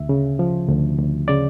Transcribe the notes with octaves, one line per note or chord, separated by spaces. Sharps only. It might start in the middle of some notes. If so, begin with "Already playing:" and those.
Already playing: D2 E5
C#3
F3
D2
D2
C#3 D5